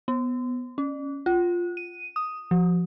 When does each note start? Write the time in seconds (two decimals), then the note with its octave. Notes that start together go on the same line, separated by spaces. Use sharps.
0.08 B3
0.78 C#4
1.26 F4
1.77 D#7
2.16 D#6
2.51 F3